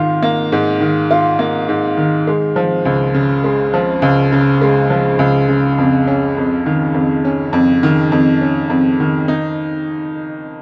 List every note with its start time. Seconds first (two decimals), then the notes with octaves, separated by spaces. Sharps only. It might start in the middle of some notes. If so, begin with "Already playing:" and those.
Already playing: G#2 D#3 F4
0.22 A#3
0.52 G#2
0.81 D#3
1.11 F4
1.39 A#3
1.69 G#2
1.97 D#3
2.27 G#3
2.56 F3
2.85 C#2
3.14 C#3
3.44 G#3
3.74 F3
4.02 C#2
4.32 C#3
4.62 G#3
4.90 F3
5.19 C#2
5.48 C#3
5.78 F2
6.07 C#4
6.37 F2
6.66 D#3
6.94 F2
7.25 C#4
7.53 F2
7.83 D#3
8.12 F2
8.41 C#4
8.70 F2
9.00 D#3
9.28 D#4